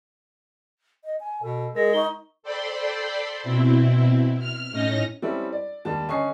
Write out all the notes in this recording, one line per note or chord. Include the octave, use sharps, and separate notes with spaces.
D#5
G#5
B2 A4
G#3 G#4 A#4 A#6
D#4 C#6 G7
A4 C5 D5 G5 B5 C6
B2 C4 E4
F6
A2 C#4 D#4 D#5 A#6
G3 C4 C#4 E4 A4
D5
D#2 G3 A5
D3 C#4 D#5 G#5 C#6 C7